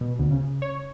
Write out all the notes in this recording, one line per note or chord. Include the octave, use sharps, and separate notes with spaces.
B2
D2
C#3
C#5